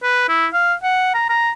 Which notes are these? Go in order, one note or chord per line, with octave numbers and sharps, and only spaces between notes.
B4
E4
F5
F#5
A#5
A#5